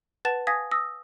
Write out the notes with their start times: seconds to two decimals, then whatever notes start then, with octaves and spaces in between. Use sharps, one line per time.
0.25 B4 F#5 A5 A6 E7
0.47 F5 G#5 D#6 G#6 A#6 B6
0.71 D#6 E6 A#6